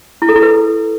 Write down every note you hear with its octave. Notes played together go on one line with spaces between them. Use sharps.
E4
A4
E4
B4